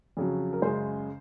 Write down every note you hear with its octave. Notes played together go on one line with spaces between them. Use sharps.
F2 C#3 F#3
A#4
F#2 C#3 G#3 C5